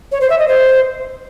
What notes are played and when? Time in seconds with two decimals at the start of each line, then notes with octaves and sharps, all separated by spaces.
0.11 C#5
0.20 C5
0.29 E5
0.39 D#5
0.48 C5